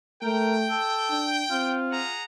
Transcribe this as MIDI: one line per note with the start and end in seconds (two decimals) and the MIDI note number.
0.23 0.77 57
0.23 0.55 70
0.23 1.82 79
0.70 1.27 69
1.10 1.45 62
1.51 2.02 60
1.51 2.15 65
1.91 2.24 68
1.91 2.24 78
1.91 2.24 82